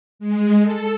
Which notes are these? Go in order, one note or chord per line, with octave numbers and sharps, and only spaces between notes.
G#3
A4